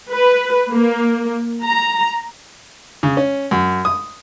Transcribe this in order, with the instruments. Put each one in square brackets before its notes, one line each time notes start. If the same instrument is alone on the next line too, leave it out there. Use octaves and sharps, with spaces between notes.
[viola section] B4
A#3
A#5
[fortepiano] C#3
C#4
F#2
D#6